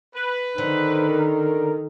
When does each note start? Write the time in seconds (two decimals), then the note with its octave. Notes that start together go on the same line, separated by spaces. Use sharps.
0.15 B4
0.58 D3 D#3 C5
1.10 A#4